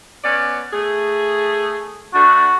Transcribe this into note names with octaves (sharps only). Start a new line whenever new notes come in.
B3 C#4 D5
A3 G#4
D3 A3 D4 F#4